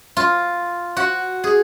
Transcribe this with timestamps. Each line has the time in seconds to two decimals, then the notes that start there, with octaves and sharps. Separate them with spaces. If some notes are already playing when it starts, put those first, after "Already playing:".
0.17 F4
0.97 F#4
1.44 G#4